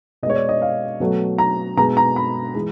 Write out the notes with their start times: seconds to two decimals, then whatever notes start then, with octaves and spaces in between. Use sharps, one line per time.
0.23 B2 D#5
0.26 G#3 C#5
0.36 D5
0.49 D#5
0.62 F5
1.00 B2 F#3 A3
1.38 A#5
1.77 B2 G#3 A#5
1.97 A#5
2.16 B5
2.55 E3 G#3